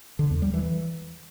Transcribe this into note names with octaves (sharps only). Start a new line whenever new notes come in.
D3
E2
G3
E3